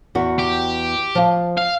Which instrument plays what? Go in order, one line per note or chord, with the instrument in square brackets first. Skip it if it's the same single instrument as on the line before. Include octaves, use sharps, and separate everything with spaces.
[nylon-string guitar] E2 B3 F#4
[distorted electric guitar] G4
[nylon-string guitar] F3 F5
[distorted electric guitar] F5